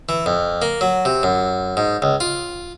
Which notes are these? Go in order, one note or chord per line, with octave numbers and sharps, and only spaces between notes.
E3
F2
A#3
F#3
C3
F#2
G#2
C#2
F4